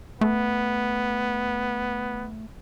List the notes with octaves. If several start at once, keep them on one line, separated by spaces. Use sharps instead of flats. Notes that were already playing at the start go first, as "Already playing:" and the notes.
A3 B3